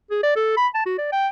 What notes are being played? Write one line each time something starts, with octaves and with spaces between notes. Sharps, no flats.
G#4
D5
A4
B5
A5
F#4
D5
G5